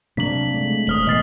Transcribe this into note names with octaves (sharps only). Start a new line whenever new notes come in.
C3 F#3 A#3 D4 B6 F#7
G#3 A3
D#1 D#6 F6 F#7
B2 E3 D#5 F6 A6 C7